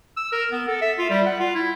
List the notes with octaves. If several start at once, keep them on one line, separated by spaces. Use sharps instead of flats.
E6
A#4
B3
A4
E5
F4
G3
F#5
F4
E4